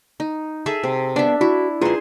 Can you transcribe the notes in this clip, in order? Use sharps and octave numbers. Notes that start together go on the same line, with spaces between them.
D#4
G#4 A4 E5
C3
B3 D4 D5 E5 A5
E4 F#4
F4 G#4 B4 C5 A#5